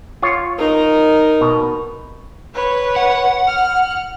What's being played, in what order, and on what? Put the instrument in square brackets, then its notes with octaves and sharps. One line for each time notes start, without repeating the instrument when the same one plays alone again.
[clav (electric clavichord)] F4 C#5
[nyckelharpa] D#4 A#4
[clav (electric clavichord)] B2
[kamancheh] B4 C#5
[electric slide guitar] F#5
[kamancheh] F6